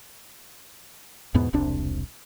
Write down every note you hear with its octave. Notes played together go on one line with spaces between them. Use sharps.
E2 G#2 B2 B3
E1 C2 C3 D4